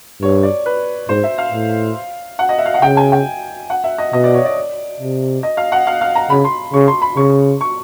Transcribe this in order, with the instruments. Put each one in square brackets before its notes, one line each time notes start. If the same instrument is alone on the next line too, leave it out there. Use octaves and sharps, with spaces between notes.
[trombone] G2 [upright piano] C#5
[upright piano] D5
B4
[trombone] G#2 [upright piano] C5
[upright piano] E5
F5
[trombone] A2
[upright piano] F#5
D#5
E5
F5
F#5
[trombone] C#3 [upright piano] G5
[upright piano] G#5
G5
F#5
E5
D#5
[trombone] B2 [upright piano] D#5
[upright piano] D5
C#5
D5
[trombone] C3
[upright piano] D#5
F5
F#5
F5
F5
A#5
[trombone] C#3 [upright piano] B5
[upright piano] C6
[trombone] C#3 [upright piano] C#6
[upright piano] C6
B5
[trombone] C#3 [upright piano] C#6
[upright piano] C#6